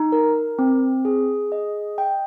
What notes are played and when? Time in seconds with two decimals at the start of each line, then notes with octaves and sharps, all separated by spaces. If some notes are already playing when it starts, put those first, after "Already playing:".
Already playing: D#4
0.12 A#4
0.59 C4
1.05 G#4
1.52 D#5
1.98 G5